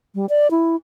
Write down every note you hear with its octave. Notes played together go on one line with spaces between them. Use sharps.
G3
D5
E4